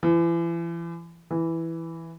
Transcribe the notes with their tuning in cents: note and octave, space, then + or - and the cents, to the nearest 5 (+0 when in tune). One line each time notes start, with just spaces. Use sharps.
E3 +35
E3 +0